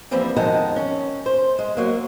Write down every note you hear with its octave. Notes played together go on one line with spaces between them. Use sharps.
E3 F3 G3 A#3 C4 E4
F2 D#3 F3 G#3 F#5 A5
C#4
C5
G#3
F#3 A#3